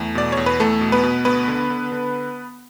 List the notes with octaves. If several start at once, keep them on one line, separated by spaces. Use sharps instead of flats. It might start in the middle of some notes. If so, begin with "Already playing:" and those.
Already playing: E2 A3
B2 D5
E2 C#5
B4
E2 A3 A4
B2
B3 B4
B2
D2 B3 B4
D3
D3
D3